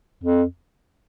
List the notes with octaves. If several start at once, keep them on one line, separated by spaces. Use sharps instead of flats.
F2